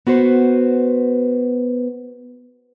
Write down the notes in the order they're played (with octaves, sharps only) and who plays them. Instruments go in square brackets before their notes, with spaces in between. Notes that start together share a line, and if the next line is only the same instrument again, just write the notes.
[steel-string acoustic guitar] B3 F#4 B4 C5